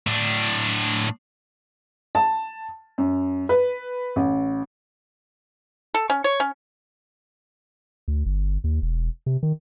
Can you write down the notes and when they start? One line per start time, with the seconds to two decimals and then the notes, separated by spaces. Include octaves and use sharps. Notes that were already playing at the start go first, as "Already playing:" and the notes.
0.07 A2 D4
2.15 A5
2.98 F#2
3.49 B4
4.16 A1
5.94 A4
6.10 C#4
6.24 C#5
6.40 C#4
8.08 D2
8.26 G1
8.64 D#2
8.82 E1
9.26 C3
9.43 D#3